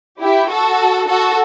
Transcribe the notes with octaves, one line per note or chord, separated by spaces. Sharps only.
E4 G4
F#4 A4
F#4 A4